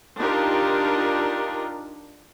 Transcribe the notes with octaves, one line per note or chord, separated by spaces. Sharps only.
D4 D#4 F4 G4 A#4